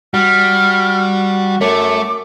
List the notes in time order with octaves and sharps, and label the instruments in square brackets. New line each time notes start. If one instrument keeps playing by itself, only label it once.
[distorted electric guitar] G3 [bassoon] F#4 [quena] F6
[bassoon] F#2 [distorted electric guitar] A3 [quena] D6